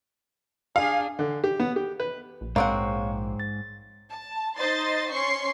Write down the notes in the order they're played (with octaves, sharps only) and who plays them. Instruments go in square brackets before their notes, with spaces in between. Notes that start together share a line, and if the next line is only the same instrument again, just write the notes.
[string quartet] D4 G#4 [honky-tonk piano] F5
[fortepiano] D3
G4
B3
G4
B4
[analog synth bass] A#1
[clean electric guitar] G#2 G#3 [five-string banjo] A#3 C4 F#5 [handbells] C#5 F5 C#6
[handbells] A6
[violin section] A5
D#4 C5 D#5 C6 A6
C#4 C6 C#6 C7